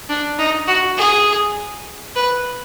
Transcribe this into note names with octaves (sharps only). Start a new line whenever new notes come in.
D4
D#4
F#4
G#4
B4